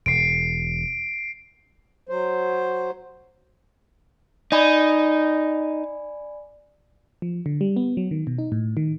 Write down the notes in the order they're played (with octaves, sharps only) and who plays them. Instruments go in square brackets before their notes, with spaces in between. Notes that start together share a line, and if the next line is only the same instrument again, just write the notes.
[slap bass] E1 [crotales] C7 D7
[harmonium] F#3 C5
[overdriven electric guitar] D#4 [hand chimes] D5 G#5 B5
[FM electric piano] F3
D3
G3
B3
F#3
D#3
B2
D#4
A2
D#3